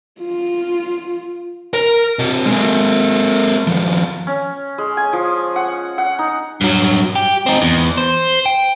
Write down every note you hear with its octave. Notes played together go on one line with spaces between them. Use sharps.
F4
A#4
C3 D#5
G#3 A#3
D#2 F3
C#4
G#3
G#5
F3
F#5
F#5
D#4
G2 F#3
G4
C4 D#4
E2
C5
G5